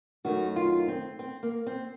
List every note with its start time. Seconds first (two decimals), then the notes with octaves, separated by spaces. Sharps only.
0.24 F#2 D#3 A3 F#4
0.56 F4
0.88 C4
1.19 C4
1.43 A#3
1.67 C4